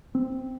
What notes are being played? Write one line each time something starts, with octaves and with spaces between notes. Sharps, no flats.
C4